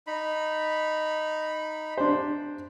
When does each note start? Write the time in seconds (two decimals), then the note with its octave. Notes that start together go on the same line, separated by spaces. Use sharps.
0.07 D#4 B5
1.98 D4 C5